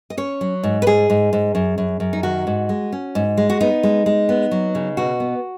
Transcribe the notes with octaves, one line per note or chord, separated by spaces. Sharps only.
D#5
C#4 C#5
F#3
G#2
B4
G#2 G#4
G#2
G#2
F#2
F#2
F#2
D#4
D#3 F#4
G#2
G#3
C#4
G#2
G#3
F#4
B3 D#4
G#3
G#3
B3
F#3
C#3
B2 F#4
B3